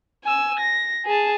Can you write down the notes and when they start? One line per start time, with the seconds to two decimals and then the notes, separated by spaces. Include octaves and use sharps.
0.24 G#5 E6
0.60 A#6
1.05 G#4 A5